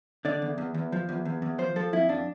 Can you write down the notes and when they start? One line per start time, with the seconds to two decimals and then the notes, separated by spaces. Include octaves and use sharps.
0.25 D3 D5
0.42 E2
0.58 E2
0.74 E2
0.92 F3
1.09 E2
1.25 E2
1.42 E2
1.58 F3 C5
1.76 F3 A4
1.93 F2 E4
2.09 F2 D4